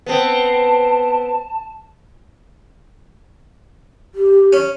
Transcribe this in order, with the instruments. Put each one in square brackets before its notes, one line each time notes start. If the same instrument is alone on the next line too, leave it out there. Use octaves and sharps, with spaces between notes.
[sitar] B3 C4 [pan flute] A5
[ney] G4
[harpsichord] C#4